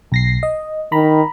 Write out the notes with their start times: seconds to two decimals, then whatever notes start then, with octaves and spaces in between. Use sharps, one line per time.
0.12 B1 A#6 C7
0.43 D#5
0.92 D#3 A#5 B5